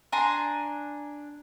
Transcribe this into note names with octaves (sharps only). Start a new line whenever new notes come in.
D4 G#5 A#5 C6